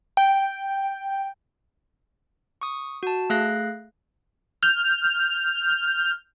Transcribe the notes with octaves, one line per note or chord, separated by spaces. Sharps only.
G5
C#6 D#6
F#4 A5
A3 G#4 F5 F#6 A#6 C7
F6 G6